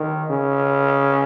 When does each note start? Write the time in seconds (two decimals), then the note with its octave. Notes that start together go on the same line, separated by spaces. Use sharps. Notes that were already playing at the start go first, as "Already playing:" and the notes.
Already playing: D#3
0.30 C#3